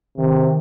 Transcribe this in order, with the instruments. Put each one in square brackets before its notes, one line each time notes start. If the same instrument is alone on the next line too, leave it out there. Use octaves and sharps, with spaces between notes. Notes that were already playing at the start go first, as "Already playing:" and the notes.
[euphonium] C3 [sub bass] D#3